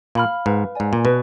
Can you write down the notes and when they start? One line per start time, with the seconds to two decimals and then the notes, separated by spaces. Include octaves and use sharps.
0.15 A#2 F5 B5 F6
0.46 G#2 B4
0.75 G#2 D5 G#5
0.93 A#2
1.05 B2 B4